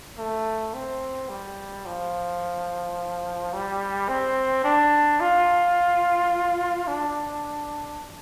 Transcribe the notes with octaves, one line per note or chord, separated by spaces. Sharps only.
A3
C4
G3
F3
G3
C4
D4
F4
D4